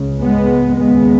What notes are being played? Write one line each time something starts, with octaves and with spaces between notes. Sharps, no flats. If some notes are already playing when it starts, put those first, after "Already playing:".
Already playing: C#2 C#3
G#3 B3
D#2 C#3 G#3 B3